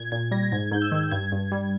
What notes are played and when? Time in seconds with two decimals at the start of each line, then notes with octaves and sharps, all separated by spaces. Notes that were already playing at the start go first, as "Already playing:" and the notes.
Already playing: A#2 G#6
0.12 A#2 G#6
0.31 G3 A#6
0.52 G#2 G#6
0.71 G#2 G6
0.82 E6
0.92 D#3
1.11 G2 G#6
1.32 G2
1.52 G3